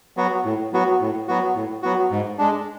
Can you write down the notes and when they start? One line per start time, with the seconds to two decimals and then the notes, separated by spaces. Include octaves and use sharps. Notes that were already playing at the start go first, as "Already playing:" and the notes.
0.17 F#3 B3 F#4
0.45 A2
0.73 F#3 B3 F#4
1.01 A2
1.28 F#3 B3 F#4
1.55 A2
1.82 F#3 B3 F#4
2.11 G#2
2.38 G#3 D4